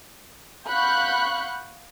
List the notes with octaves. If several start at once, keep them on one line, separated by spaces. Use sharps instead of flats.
F5 F#5 B5 C#6 F#6 G6